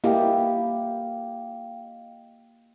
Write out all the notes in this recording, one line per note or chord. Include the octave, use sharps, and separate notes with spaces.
A#3 E4 G4 D#5 F5 G5